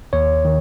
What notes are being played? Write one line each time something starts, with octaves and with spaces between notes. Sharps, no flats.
D#2 C#5
D#3